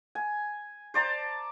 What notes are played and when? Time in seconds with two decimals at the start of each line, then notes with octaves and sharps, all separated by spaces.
0.15 G#5
0.94 C5 D5 A5 A#5